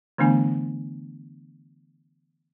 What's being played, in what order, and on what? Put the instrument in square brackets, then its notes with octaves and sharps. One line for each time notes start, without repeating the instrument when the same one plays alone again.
[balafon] D3 E3 A3 B3 D4 G#5